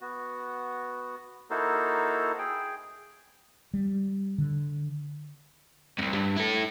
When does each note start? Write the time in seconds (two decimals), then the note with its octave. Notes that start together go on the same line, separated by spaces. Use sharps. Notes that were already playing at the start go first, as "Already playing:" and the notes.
0.01 B3 F#4
1.50 A#3 D#4 E4 F#4 A4 C5
2.38 G#4 G5
3.74 G3
4.38 D3
5.99 C2 F#2
6.15 G2
6.37 E4 A4